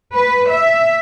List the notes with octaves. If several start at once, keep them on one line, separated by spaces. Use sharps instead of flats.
B4
E5